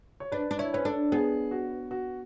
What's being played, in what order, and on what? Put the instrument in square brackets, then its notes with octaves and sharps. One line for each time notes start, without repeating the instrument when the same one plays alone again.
[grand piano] C#5
[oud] D4 [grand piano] B4
[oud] D4
[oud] E4 [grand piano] C#5
[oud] C#4 [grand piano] B4
[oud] D4 [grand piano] A4
[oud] B3 [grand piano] G#4
[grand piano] F#4
F#4